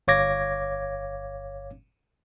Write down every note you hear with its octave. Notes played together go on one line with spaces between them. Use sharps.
G1 C#5 F5 D6 G#6 A#6